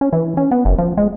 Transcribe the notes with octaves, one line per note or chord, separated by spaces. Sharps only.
C#4
E3
C#4
B3
F#1
F3
G#3